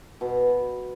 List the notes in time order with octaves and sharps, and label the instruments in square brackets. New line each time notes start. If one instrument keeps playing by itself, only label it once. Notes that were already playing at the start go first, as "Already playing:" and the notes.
[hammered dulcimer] B2